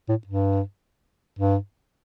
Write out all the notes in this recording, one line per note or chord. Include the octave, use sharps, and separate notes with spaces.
A2
G2
G2